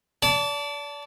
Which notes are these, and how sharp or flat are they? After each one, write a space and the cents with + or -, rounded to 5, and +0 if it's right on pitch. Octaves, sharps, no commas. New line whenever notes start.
D5 -35 A5 +0